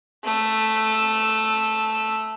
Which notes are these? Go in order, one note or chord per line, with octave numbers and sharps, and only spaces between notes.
A3 E6